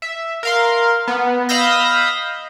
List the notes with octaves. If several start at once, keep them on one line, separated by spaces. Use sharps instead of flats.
E5
A#4 F5 C6
B3
D#5 F5 B5 E6 G6 A#6